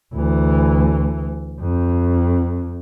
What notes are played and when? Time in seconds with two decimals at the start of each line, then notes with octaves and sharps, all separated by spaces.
0.14 D2 E3
1.60 F2